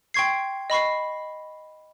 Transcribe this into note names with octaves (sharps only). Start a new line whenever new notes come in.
G5 C6 C#6 G#6 C7
D#5 B5 C#6 C7